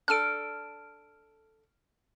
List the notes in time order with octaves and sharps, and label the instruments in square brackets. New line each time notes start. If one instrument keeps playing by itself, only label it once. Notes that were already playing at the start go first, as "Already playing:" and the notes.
[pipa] D4 A4 [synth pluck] F6 D7